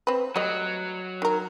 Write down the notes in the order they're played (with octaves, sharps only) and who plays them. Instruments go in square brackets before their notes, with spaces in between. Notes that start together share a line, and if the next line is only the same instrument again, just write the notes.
[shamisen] C4 B4
[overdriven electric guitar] F#3 [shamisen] G3 A3 D#5
[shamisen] D#3 A#4